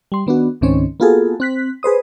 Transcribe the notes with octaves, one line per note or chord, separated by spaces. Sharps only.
G3 C6
D#3 B3 D4 F#4
C#2 G#2 D#3 C4 C#4 C#5
A#3 B3 F4 F#4 G#4 A4
C4 F#6 B6
G#4 B4 C5 D#6